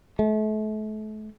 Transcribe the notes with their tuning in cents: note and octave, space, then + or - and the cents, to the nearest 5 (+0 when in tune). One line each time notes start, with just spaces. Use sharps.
A3 -35